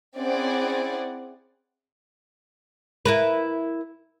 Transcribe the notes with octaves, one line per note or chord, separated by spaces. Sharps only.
C4 C#4 E4 G#4 D5 F#5
E4 A#4 B4